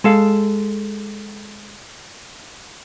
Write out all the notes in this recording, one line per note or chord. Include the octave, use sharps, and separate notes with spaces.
G#3 A4 F5